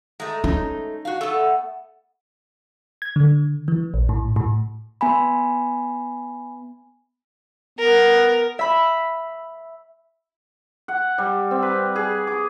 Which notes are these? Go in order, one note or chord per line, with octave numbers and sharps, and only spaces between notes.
G#3 A3 A#5
C#4 D#4
F#4 F5
A3 B3 A4
G#6
D3
E3
A#1
A2
A2
B3 G#5 B5
B3 A#4
E5 B5
F#5
G3
C4
B4
G#4
D6